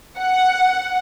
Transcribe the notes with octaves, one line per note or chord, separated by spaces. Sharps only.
F#5